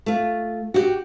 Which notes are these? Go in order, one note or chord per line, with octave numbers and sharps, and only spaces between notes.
A3 F4
F#4 G4